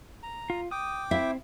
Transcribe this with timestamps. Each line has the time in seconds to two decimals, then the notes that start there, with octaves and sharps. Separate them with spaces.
0.23 A#5
0.50 F4
0.71 G5 D6 D#6
1.11 C4 E4 E5